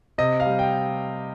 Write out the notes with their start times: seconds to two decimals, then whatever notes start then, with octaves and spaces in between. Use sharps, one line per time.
0.18 C3 D#5
0.40 F5
0.46 G3
0.59 G5